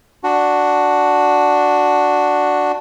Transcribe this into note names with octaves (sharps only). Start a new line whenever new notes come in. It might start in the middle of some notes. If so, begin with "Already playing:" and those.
D4 F#4